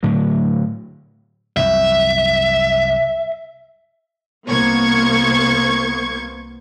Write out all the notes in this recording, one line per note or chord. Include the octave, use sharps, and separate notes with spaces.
A2 D3 F#3
C2 F#2 E5
C2 A#3 B3 C5 C#6 G#6